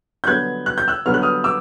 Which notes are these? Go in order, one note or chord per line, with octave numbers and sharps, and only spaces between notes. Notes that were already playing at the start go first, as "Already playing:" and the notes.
G6
G2 D3 F#3 B3 F#6 G#6
F#6
G6
E6 F#6
G2 D3 F#3 B3 F6
F#6
D#6 F6
D6 E6